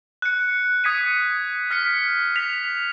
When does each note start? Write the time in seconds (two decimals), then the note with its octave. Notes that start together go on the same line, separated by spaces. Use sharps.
0.22 F#6 C#7
0.84 D#6 G#6 B6 C#7 D#7
1.71 F6 B6 C#7
2.36 B6 F7